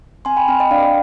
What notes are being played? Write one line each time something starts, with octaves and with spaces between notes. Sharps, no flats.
C4 G#5 C6
G5 B5
C4 G5 B5
D#5 G5
D4 D5 F5